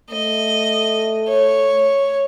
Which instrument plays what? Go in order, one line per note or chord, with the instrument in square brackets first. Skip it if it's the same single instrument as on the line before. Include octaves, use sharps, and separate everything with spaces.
[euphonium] A3 [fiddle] D#5
[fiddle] C#5